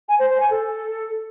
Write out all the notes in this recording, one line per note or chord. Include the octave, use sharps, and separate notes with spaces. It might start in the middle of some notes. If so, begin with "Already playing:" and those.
G#5
C5
C5
G#5
A4